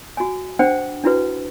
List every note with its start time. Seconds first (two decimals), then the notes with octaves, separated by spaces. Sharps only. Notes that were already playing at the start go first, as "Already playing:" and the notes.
0.17 F#4 G#5
0.59 D4 C5 F#5 G5
1.04 D4 E4 F#4 B4